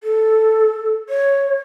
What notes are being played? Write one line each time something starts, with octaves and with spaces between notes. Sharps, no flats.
A4
C#5